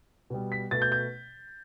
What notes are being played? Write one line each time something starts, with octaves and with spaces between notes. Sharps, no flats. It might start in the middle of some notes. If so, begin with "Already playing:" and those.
B2 G3 B3
B6
B2 A3 A6
G6
G6